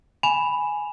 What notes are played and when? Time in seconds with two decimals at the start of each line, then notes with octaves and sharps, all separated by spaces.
0.23 G#5 B5 E7 F7